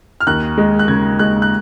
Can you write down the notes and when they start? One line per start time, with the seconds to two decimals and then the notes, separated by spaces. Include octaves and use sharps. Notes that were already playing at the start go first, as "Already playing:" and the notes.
0.20 F6
0.27 D#2 F#6
0.58 G#3
0.79 F#6
0.88 C#3 G#6
1.19 G#3 F#6
1.42 F#6